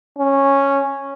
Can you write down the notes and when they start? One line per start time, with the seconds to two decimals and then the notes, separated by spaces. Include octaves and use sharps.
0.18 C#4